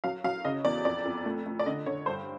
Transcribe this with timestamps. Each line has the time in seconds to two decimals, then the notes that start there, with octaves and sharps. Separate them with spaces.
0.04 F#3 F5
0.24 F#3 F5
0.45 C#3 D#5
0.65 E2 D5
0.85 F2 D5
1.05 F2
1.26 A3
1.46 A3
1.59 D5
1.66 D3 D#5
1.86 D3 C#5
2.06 G2 C5